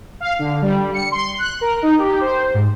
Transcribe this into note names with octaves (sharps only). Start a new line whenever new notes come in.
F5
D3
G3
C#7
C6
F#6
A#4
D#4
G4
C5
G#2